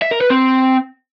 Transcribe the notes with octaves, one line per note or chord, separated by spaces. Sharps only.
E5
A#4
B4
C4